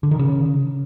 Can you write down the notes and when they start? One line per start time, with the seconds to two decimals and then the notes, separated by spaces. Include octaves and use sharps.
0.03 D3
0.11 D#3
0.19 C#3